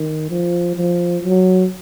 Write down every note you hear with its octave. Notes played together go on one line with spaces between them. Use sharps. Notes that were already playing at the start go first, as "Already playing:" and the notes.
Already playing: D#3
F3
F3
F#3